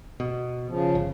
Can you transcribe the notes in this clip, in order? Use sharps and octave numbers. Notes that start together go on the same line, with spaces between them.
B2
C#3 F3
G1